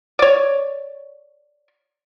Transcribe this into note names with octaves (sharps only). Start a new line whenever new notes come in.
C#5 D5